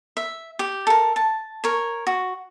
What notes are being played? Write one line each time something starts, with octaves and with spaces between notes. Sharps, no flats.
E5
G4
A4 A#4
A5
A#4 C#5
F#4